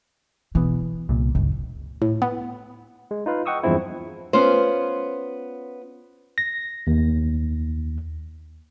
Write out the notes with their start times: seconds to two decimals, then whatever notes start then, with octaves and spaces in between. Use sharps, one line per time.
0.55 B2 E3 B3
1.09 C2 A#2
1.35 G1 C#2 F#3
2.02 A2
2.22 B3
3.11 G#3
3.26 D#4 F4 B4 F5
3.46 D#5 F#5 G5 C#6 D#6 E6
3.63 E2 G2 F3 G#3 C4 E4
4.33 B3 C#4 F4 C5
6.38 A#6
6.87 D#2